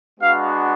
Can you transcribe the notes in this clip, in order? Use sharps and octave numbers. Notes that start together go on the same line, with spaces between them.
G#3 B3 D4 F#4 F5